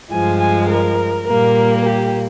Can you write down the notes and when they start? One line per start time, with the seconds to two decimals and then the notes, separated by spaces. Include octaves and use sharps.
0.11 G2 F3 G#3 G#5
0.40 G#5
0.68 A#4
1.26 A#2 G3 A#3 A#4
1.84 G4